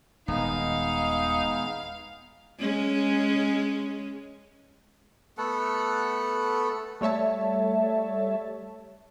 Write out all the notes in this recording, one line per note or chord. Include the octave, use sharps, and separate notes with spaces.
D#1 G#3 B3 D#4 F5
G#3 C#4
A3 B3 A4 F#5
G3 A3 C#5 E5 A5